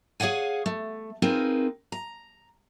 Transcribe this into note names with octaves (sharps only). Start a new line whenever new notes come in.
G#4 C#5 F5 F#5 G#5
A3
C4 D#4 F4 G#4 A#4 B4
A#5